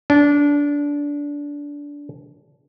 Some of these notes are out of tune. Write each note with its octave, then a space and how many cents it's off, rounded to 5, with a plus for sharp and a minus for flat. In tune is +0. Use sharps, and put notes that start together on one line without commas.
D4 -20